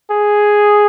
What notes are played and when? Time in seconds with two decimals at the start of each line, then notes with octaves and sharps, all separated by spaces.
0.11 G#4